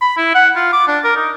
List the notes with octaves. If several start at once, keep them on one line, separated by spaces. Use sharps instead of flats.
B5
E4
F#5
F4
D6
D4
A#4
D#4